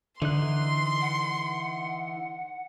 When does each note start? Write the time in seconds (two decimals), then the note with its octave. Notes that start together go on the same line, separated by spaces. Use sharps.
0.22 D3 E3 D#4 C6 F#6
1.01 F#5